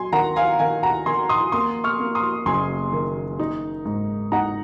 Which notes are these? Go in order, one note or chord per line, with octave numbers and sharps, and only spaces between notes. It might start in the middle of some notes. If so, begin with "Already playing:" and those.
Already playing: F#3 G#5 C6
D#3 F#5 A#5
F5 G#5
D#3 F5 G#5
F#5 A#5
D#3 G#5 C6
C6 D#6
A#3 C6 D#6
C#6 F6
A#3
C6 D#6
F#1 G#5 C6
D#3
D#4
G#2
D#4 F#5 A#5